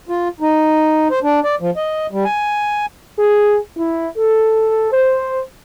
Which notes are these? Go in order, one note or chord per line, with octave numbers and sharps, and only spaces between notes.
F4
D#4
C5
D4
D5
F3
D#5
G3
G#5
G#4
E4
A4
C5